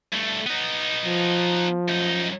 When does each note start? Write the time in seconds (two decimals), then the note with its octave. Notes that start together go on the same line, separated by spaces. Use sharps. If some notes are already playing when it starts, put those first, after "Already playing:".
0.13 G2 A3
0.46 B3 D#4
1.05 F3
1.88 F#2 D#4